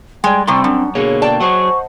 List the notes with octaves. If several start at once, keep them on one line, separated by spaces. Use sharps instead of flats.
G3 G#3 D5 G5
A2 C3 C4 C6 C#6
F#2 D4
B2 D3 A#3 G#4 C#5
D5 G5 A5
F#3 G#4 C5 D#5 F#5 C#6